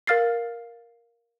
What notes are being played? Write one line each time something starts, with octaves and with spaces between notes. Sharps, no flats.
A#4 F5 F6 A6 C7